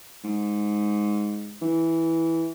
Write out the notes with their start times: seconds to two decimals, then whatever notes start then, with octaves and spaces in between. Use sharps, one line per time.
0.24 G#2
1.62 E3